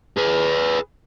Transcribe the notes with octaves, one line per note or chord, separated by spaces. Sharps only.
G#4 B4